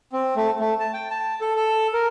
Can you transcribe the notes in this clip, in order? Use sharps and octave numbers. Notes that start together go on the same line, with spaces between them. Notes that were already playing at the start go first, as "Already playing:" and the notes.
C4
A3
A3
A5
G5
A5
A4
A4
A#4